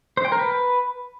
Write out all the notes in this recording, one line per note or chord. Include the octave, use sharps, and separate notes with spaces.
C5
G5
A#4
B4